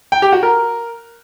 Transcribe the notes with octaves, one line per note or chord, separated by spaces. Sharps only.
G5
G4
F#4
A#4